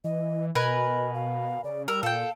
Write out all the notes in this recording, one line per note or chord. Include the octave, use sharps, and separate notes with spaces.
E3 D#5
B2 A#4 B4 D#5 G#5
F5
C#3 D5
G3 A#4 E6
A#2 A4 F5 G5